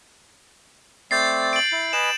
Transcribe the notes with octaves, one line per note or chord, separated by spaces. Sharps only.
A3 C4 D5 G6 A6 C7
D7 F#7
E4
B4 D#5 G#5 E7